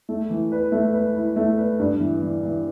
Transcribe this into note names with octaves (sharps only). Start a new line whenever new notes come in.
A3
E3
B4
A3
B4
E4
A3
B4
G2
E3
E3
E3